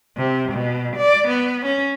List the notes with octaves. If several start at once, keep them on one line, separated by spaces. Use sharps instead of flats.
C3
B2
D5
B3
C#4